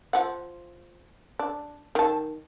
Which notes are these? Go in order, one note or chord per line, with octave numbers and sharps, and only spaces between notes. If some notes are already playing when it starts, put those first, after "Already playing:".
F3 F#5
D4
D#3 A5